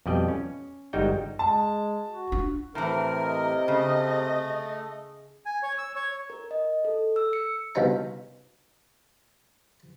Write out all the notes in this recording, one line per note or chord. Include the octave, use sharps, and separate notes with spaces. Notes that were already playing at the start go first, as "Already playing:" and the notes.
F2 B2 G3 D5 D#5 G5
C#4
G1 G3 G#3 D#4 F#4 G5
G#3 A5
F#4
D4 F4
A2 C3 E3 A#4
D#5
C#3 A3
G#5
C#5
E6
C#5
A#4
D#5
A4
E6
C#7
C2 B2 F3 C#4 D#4 A#5